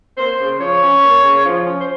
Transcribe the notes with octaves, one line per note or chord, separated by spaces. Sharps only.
A#3 C5
C#3
F3 C#5
C#4
A#3
C#3
F3
C#4
C5